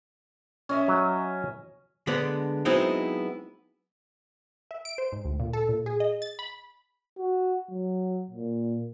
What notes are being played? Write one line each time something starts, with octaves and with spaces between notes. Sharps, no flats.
C#4 D#5 E5
F#3
D3 G#3 B3 D4
F#3 G#3 B3 C4 D#4 E4
E5
D7
C5
G#2
D2
A#2
A4
A#2
G#4
D#5
A6
B5
F#4
F#3
A#2